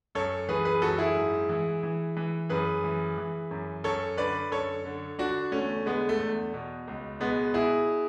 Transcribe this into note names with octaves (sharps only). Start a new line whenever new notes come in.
F#2 A4 C#5
E3 G#4 B4
G#4 B4
F#2 F#4 A4
E4 G#4
G#2
E3
E3
E3
F#2 G#4 B4
E3
E3
F#2
F#2 A4 C#5
D3 B4 D5
F#2 A4 C#5
D3
D3 D4 F#4
E2 A3 C#4
D3 G#3 B3
A3
E2
B2
C#2
B2 G#3 B3
B2 E4 G#4